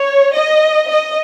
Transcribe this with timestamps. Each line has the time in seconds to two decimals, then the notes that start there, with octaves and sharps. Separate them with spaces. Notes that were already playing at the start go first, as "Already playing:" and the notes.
Already playing: C#5
0.35 D#5
0.90 D#5